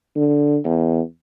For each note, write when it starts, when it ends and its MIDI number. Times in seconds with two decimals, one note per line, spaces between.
0.16 0.58 50
0.64 1.01 40